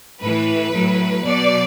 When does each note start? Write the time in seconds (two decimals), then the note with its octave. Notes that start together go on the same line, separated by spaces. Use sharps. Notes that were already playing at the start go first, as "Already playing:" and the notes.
0.22 A2 E3 B4
0.73 A2 F#3
1.24 B2 F#3 D5